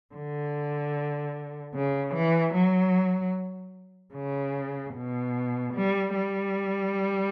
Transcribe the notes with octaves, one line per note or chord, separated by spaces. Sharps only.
D3
C#3
E3
F#3
C#3
B2
G3
G3